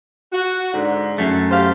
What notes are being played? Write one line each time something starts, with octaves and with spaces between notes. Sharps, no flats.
F#4
G#2 D3
F#2 A3
G4 C5 F5